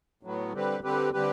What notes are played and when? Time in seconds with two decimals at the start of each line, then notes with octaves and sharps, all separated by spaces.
0.23 A2 F#3 B3
0.53 D3 G3 C4 G4 B4
0.84 D3 G3 C4 G4 B4
1.13 D3 G3 C4 G4 B4